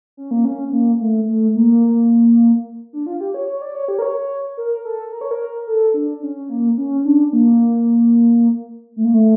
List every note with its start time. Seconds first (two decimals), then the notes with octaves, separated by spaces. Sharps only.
0.17 C#4
0.31 A#3
0.45 C#4
0.72 A#3
1.01 A3
1.28 A3
1.55 A#3
2.93 D4
3.06 F4
3.21 G4
3.34 C#5
3.48 C#5
3.62 D5
3.75 C#5
3.88 G4
3.99 A#4
4.02 C#5
4.57 A#4
4.85 A4
5.12 A#4
5.21 C#5
5.31 A#4
5.67 A4
5.94 D4
6.22 C#4
6.49 A#3
6.78 C#4
7.05 D4
7.33 A#3
8.96 A3
9.04 A#3
9.14 A3